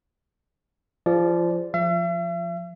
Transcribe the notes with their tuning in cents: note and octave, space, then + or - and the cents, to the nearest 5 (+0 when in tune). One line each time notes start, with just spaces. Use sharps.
F3 -20 G#4 -15 D5 -5
F3 +0 E5 +45